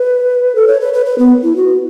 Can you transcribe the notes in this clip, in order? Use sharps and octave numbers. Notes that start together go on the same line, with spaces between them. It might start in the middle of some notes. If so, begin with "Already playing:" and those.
Already playing: B4
A4
C#5
B4
B4
B4
B3
E4
F#4